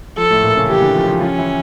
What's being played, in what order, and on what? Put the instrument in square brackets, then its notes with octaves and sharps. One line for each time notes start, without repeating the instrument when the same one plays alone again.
[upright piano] F3 [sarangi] A4
[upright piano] A2 A3
A#2 A#3
C#3 C#4
[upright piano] E3 E4 [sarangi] G4
[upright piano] D3 D4
F3 F4
F3 F4
[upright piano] F3 F4 [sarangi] C#4
[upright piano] E3 E4